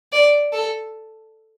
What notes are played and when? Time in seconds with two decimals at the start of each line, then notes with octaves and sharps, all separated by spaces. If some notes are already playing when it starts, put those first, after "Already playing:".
0.12 D5
0.53 A4